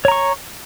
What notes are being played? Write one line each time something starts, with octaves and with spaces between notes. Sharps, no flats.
C#5 A#5 C#6